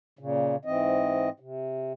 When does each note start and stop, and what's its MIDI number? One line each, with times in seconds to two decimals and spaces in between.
0.19 0.56 46
0.19 0.56 49
0.65 1.30 44
0.65 1.30 52
0.65 1.30 60
0.65 1.30 75
1.40 1.93 48